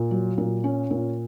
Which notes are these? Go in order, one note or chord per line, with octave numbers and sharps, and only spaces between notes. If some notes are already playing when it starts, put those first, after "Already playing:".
Already playing: A#2
F#3
A#2
C#4
A#2